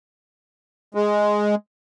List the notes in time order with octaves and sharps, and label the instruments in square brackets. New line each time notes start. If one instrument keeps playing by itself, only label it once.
[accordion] G#3